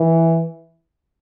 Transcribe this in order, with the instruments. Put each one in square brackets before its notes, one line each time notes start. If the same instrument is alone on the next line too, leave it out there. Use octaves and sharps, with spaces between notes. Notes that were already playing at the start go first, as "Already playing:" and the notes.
Already playing: [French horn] E3